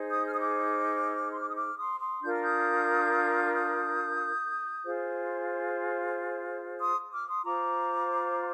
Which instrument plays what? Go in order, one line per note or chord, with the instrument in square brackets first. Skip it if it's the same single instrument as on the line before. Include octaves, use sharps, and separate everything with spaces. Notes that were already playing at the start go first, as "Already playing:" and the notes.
Already playing: [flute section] D#4 G#4 C5
D#6 G6
F6
D#6
D6 F6
C6
D6
D#6
D6 F6
C6 D#6
C6 D#6
D4 F4 A#4 G6
F6
D#6 G6
D#6 G6
F4 G#4 C5
C6 D#6
D6 F6
C6 D#6
F4 C5 A#5 D6